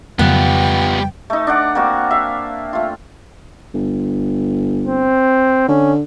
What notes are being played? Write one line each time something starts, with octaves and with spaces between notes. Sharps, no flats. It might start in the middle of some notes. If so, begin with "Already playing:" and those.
F2 C#3 F#3 G3 B3 F4 G5
A3 D#4
D4 D5 F#5
A#3 C4 D4 F#4
E5 F5
A3 F4
G1
C4
D3 C#4